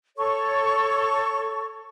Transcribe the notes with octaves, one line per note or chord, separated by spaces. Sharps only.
A4 C#5 C#6